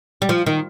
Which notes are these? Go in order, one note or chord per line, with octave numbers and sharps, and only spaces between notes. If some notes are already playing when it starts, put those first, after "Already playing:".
G3
F3
D#3